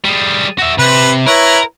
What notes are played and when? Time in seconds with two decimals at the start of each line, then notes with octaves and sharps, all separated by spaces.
0.05 G3 G#4
0.59 F#4 E5
0.79 C3 B4
1.27 E4 A#4 B4 C#5